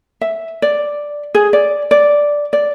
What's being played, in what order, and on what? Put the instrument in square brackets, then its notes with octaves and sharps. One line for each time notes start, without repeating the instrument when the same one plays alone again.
[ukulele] E5
D5
G#4
D5
D5
D5